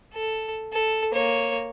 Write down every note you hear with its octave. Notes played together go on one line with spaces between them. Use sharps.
A4
A4
A#3 C#5